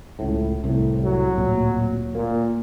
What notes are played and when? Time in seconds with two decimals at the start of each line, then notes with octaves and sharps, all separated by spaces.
0.19 C#2 A2
0.64 C2 A2
1.04 F#3
1.37 D1 A#2
2.15 A#2 A#3